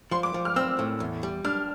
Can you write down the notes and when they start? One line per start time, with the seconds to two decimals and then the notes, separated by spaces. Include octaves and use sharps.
0.11 F3 C6
0.23 D6
0.34 F3
0.45 F6
0.56 C4 E6
0.79 A2
1.00 E2
1.23 G3
1.44 D4 F6